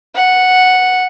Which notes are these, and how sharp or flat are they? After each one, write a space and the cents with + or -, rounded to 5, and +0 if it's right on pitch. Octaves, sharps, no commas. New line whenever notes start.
F#5 -5